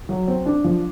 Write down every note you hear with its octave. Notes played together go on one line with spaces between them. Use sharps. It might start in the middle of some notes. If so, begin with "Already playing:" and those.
F#3
C4
D4
F3